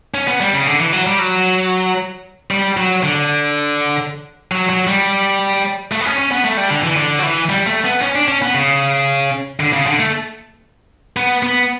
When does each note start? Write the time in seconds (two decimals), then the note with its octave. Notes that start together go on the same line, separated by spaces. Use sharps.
0.14 C#4
0.28 B3
0.41 G3
0.54 C#3
0.67 D3
0.80 E3
0.92 F#3
1.07 G3
1.19 F#3
2.51 G3
2.77 F#3
3.03 D3
4.52 F#3
4.70 F#3
4.87 G3
5.92 A3
6.01 B3
6.05 C#4
6.18 C#4
6.31 B3
6.44 A3
6.57 G3
6.70 D3
6.83 E3
6.97 D3
7.19 F#3
7.23 E3
7.50 G3
7.67 A3
7.85 B3
8.02 C#4
8.15 D4
8.28 C#4
8.42 B3
8.54 C#3
9.60 D3
9.73 C#3
9.86 D3
9.99 A3
11.17 B3
11.43 B3